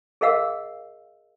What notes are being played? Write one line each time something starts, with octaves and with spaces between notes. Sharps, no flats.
G#4 A#4 D#5 F5 F#5 E6